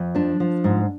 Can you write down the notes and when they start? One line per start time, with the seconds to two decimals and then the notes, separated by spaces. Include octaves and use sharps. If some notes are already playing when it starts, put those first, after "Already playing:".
Already playing: F2
0.15 F3 D4
0.40 F3
0.64 G#2